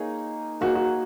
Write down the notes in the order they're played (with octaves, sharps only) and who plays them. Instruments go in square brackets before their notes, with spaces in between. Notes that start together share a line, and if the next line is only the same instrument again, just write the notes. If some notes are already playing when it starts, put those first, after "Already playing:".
Already playing: [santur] A#3 D#4 G#4 C#5
[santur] A#3 D#4 G#4 C#5 [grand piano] F#4
[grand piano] F#4